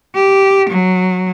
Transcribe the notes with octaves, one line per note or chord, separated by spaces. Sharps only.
G4
F#3